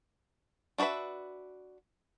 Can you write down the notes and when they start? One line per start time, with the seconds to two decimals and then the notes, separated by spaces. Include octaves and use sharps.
0.78 D4 F#4 G#4 B4 E5